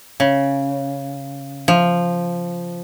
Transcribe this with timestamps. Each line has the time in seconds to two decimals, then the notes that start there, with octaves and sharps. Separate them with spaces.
0.20 C#3
1.68 F3